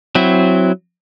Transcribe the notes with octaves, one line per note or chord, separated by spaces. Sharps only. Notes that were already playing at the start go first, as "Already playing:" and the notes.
F#3 C4 E4